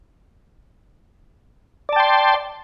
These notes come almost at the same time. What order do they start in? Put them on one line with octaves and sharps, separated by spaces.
D5 A5 G5 C6